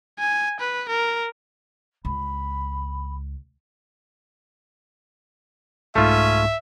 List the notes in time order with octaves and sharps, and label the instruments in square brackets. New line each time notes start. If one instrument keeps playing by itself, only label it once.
[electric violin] G#5
B4
A#4
[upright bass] C#2 [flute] B5
[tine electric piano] C2 G#2 [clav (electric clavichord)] A3 F4 [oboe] C#4 [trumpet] E5